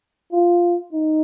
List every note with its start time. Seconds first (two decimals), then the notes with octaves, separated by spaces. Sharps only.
0.32 F4
0.93 D#4